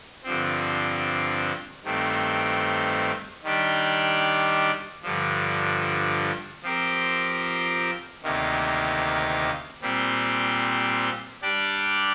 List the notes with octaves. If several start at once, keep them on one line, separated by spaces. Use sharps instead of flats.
G2 D3 F3 C4
G2 D#3 A3 C4
D#3 G3 D4 G4
G2 D3 F3
F3 C4 G4 A#4
D2 C3 D#3 A#3
A#2 G3 C4
G3 D4 G4 D5